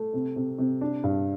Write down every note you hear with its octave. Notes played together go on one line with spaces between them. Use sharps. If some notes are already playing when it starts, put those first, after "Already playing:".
Already playing: A3
C3
C3
C3
D4
G2